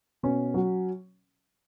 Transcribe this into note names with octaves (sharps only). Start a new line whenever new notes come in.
B2 C#4
F#3